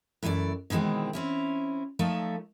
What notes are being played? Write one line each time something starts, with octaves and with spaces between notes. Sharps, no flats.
F#2 E3 A3 A4 D5
B2 D#3 E3 G#3 C4
C4 C#4 E4
F3 A3 D#4 A4 C#5